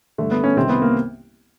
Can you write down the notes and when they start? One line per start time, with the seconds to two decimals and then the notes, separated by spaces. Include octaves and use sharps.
0.18 G2 D3 A3
0.31 B3
0.44 C#4
0.56 C2 C3 D#3 C4
0.69 B3
0.82 A#3